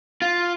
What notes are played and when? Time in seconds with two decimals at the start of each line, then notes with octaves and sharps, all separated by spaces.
0.22 F4